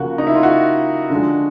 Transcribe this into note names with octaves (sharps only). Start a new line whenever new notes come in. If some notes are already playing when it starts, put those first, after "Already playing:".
Already playing: C#3 F3 A#3 F#4
D#4
E4
F4
F#4
D3 F3 G#3